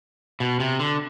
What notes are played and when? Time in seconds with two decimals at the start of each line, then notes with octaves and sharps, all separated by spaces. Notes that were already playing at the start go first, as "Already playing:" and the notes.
0.40 B2
0.60 C3
0.79 D3